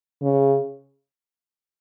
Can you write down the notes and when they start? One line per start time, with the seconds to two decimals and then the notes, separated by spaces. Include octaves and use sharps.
0.22 C#3